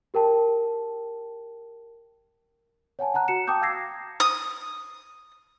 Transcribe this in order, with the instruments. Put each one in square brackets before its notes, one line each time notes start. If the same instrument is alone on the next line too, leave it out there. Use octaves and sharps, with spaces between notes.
[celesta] G4 A#4 G5 A5
C#5 F#5 G#5 A5
F#5 A5 A#5 F#6
F#4 A#5 C#7 E7
G5 A5 D6 D#6 G6
F5 D#6 E6 G#6 A#6 C7
[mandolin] D#6